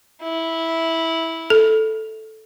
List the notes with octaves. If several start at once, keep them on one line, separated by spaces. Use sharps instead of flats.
E4
A4